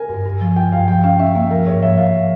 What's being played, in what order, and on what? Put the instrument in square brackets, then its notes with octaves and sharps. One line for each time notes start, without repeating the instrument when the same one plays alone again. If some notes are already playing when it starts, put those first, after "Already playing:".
Already playing: [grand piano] A#4 G#5
[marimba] G2
G2
F3
[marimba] F4 [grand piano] G5
[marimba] G2 [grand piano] F5
[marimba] F3 [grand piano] G5
[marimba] C#4 [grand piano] F5
[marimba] C#4 [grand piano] E5
[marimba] A#3 [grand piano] E5
[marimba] F3 [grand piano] A#4
[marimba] G#2 [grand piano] C#5
[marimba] F3 [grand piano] E5
[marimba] F3 [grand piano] F5